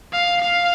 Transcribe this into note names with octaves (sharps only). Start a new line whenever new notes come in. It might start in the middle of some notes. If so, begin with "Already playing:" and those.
F5
F5